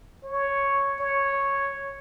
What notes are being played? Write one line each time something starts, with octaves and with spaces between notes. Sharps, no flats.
C#5
C#5